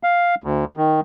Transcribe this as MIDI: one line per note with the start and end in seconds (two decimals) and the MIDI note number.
0.03 0.35 77
0.44 0.65 38
0.77 1.01 51